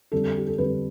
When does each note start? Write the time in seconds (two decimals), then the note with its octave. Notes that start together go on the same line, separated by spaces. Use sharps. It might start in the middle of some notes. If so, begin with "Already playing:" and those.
0.12 F2 D3 G3 A4
0.37 G4
0.47 A4
0.57 F2 D3 G3 B4